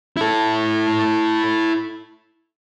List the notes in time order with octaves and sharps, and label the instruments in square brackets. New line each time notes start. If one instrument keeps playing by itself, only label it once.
[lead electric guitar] E4 A4